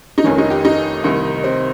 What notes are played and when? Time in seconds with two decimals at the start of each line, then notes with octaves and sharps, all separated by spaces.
0.18 D#4
0.24 F1 F2 D#3 C#4
0.38 D#4
0.50 G4
0.65 D#4
1.04 C2 C3 D#3
1.44 C4